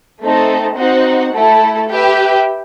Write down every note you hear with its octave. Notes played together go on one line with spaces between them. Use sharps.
A3 C4 D#4 A4
C4 D#4 F#4 C5 F#5
A3 E4 A4
G4 B4 E5 G5